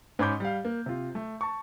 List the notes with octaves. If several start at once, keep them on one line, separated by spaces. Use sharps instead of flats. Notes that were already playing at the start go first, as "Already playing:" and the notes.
G#2 C#4 B5 D6 G6
G3 F5
A#3
C3 F4
A3
A5 C#6